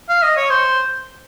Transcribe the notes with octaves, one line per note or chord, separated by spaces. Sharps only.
F5
D#5
C#5
C5